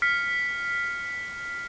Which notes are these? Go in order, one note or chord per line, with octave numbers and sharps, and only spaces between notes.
F6 B6 C#7